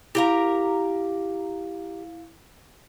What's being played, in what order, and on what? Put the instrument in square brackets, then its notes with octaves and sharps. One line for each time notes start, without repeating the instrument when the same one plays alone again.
[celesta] E4 F5 [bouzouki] G4 A#4 A#5